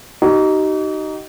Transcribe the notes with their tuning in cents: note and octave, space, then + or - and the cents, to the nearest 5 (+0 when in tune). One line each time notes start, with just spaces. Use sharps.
D#4 +0 G4 -45